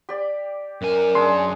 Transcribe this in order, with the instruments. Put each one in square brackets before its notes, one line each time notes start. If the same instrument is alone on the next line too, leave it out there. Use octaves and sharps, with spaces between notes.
[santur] G4 D5
[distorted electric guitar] F#2 G#5 [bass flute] A#4
[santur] D4 G#4 [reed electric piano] C6